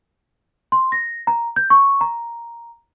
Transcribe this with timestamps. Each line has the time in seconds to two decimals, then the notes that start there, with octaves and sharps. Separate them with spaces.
0.72 C6
0.92 A#6
1.27 A#5
1.56 G6
1.70 C#6
2.01 A#5